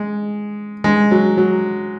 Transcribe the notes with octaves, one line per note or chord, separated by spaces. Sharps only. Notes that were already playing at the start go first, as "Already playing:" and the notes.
Already playing: G#3
G#3
F#3
F#3